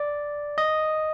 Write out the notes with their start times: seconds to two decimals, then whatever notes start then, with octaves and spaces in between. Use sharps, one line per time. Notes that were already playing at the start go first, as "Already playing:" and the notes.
Already playing: D5
0.58 D#5